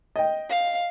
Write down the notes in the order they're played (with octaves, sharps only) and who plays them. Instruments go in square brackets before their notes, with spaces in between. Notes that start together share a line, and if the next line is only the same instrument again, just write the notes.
[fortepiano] D#5 G5
[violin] F5